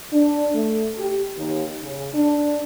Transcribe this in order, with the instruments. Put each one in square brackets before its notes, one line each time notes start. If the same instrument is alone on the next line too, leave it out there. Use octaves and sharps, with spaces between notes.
[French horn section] D4
A3
G4
D#2
C#3
D4